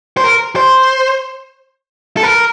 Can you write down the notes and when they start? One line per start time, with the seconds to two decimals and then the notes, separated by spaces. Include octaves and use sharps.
0.17 C5
0.24 A#4
0.56 C5
2.17 A4
2.23 A#4